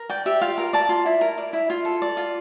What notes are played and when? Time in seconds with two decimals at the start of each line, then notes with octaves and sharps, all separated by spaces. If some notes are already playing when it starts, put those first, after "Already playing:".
Already playing: A#4
0.09 D5 G5
0.26 G4 E5
0.41 F4 F5
0.58 A#4
0.73 D5 A5
0.89 F4
1.06 E4
1.21 A#4
1.38 D5
1.53 E4
1.70 F4
1.85 A4
2.02 D5
2.17 F4